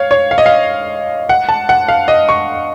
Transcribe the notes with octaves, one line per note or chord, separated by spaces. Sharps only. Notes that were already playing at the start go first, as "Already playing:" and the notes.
Already playing: C#5 F5
C#5
F5
D#5
F5
F#5
A5
F#5
F5
D#5
C#6